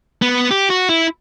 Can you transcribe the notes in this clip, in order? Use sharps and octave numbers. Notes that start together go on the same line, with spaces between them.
B3
G4
F#4
E4